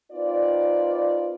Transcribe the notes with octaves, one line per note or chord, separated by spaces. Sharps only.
C4 D#4 F4 B4 D5